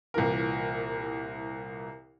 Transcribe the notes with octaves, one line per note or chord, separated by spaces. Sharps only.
C2 A#2 E3 A#4